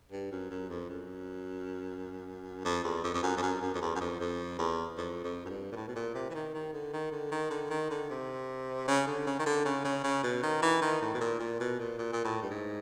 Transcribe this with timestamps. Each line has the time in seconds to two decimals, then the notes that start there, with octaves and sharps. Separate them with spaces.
0.12 G2
0.32 F#2
0.51 F#2
0.69 F2
0.90 F#2
2.65 F2
2.84 E2
3.04 F2
3.14 F2
3.23 F#2
3.37 F2
3.43 F#2
3.61 F#2
3.74 F2
3.82 E2
3.95 F#2
4.01 F2
4.20 F2
4.59 E2
4.98 F2
5.24 F2
5.46 F#2
5.49 G2
5.72 A#2
5.76 A2
5.88 B2
5.96 A#2
6.15 C3
6.30 E3
6.35 D#3
6.54 D#3
6.73 D3
6.93 D#3
7.12 D3
7.32 D#3
7.51 D3
7.70 D#3
7.90 D3
8.10 C3
8.88 C#3
9.07 D3
9.27 C#3
9.39 D#3
9.46 D3
9.65 C#3
9.85 C#3
10.04 C#3
10.23 B2
10.43 D#3
10.62 E3
10.82 D#3
11.02 A2
11.14 B2
11.21 A#2
11.40 A#2
11.60 B2
11.80 A#2
11.98 A#2
12.13 A#2
12.24 A2
12.42 G2
12.51 G#2